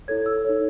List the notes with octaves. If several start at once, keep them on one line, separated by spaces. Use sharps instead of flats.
E4 A4 C#5 G#6
E6
D#4 A4 C#5